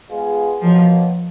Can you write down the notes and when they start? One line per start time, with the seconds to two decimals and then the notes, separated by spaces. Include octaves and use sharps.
0.09 G#3 B3 F4 G#4
0.62 B2 F3 F#3 A#3